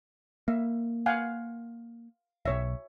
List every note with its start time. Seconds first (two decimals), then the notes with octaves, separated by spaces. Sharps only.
0.48 A#3 E5
1.06 F5 F#5 G#5
2.45 D#1 B1 C#5 E5